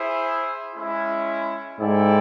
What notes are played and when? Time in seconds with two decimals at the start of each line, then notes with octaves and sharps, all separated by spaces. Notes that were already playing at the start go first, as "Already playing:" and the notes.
Already playing: E4 G#4 C5 E5
0.74 G#3 C#4 E4
1.79 G#2 E4 A4 D5 G5